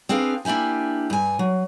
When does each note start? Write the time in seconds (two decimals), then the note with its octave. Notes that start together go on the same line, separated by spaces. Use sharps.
0.09 C4 D4 G#4 B4 F5
0.45 A#3 D4 E4 G4 G#5
1.10 G2 G#5
1.39 F#3